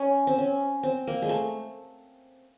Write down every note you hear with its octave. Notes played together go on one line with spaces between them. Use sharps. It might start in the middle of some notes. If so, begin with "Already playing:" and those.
Already playing: C#4
C4
C#4
C4
A#3
G#3
A3